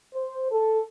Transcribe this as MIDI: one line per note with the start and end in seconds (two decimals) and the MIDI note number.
0.14 0.49 72
0.50 0.80 69